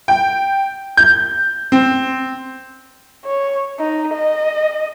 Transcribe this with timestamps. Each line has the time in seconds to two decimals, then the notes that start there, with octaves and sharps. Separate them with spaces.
0.08 G5
0.97 G6
1.72 C4
3.25 C#5
3.79 D#4
4.14 D#5